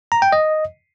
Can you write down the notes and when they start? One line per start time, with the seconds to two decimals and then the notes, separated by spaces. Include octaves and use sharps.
0.12 A#5
0.22 G5
0.32 D#5